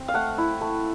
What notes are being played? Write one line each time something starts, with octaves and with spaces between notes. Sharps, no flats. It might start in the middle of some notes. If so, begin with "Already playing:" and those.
Already playing: C4
F5
A3 F#5
E4
A3